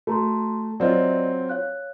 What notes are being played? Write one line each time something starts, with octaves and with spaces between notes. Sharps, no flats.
A3 F#4 A#5 C6
F#3 C4 F4 D5 D#5
C#5 F5 F#6